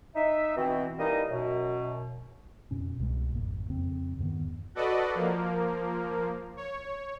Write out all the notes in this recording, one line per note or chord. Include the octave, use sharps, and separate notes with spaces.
D#4 E5
B2 E3 C4
E3 G3 A#3 D#4 D#5
F#2 B2
F2 B2 C#4
C2 B2 G#3
G#1 F2 A#3
F2 C#3 C4
E2 G2 D#3 B3
F#4 A4 B4 D5 D#5
F3 A#3
C#5